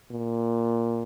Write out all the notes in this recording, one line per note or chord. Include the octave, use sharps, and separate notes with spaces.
A#2